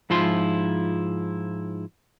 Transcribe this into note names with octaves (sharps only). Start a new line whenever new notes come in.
G#2 F3 E4 F4 C6